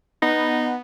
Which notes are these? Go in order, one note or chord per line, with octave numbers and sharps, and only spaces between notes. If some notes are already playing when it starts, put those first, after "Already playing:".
B3 D#4